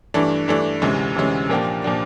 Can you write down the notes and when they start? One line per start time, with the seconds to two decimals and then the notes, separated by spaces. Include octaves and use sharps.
0.14 G2 E3 A3 D4
0.48 G2 E3 A3 D4
0.82 D2 C3 E3 G#3 C#4
1.15 D2 C3 E3 G#3 C#4
1.49 A#2 F3 A#3 D4 G4
1.84 A#2 F3 A#3 D4 G4